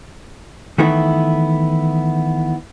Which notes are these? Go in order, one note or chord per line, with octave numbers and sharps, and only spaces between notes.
D#3 E3 A3 B3 E4